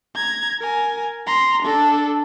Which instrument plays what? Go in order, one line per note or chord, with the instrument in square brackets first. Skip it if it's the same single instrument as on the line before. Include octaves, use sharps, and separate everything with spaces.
[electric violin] A#5 G#6
A#4 G#5
A#5 C6
D4 A4